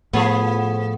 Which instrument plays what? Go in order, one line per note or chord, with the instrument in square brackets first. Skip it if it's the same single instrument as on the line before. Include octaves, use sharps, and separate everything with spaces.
[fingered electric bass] A2 [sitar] F3 G#4 A4 [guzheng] B3